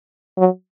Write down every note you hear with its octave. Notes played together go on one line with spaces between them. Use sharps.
F#3